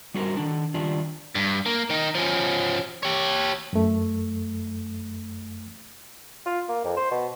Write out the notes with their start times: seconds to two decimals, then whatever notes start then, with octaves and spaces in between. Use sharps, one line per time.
0.14 G3 F#4 G#4 A#4 C5
0.37 D#3 D4
0.74 D#3 G3 D4 F4
1.35 G2
1.66 A#3
1.90 D#3 D#4
2.15 F3 C#4
3.03 G4 C#5
3.73 F#2 A3
6.46 F4
6.69 A#3
6.85 F2
6.97 C5
7.11 B2